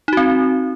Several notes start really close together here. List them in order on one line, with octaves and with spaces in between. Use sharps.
D#4 F#4 C4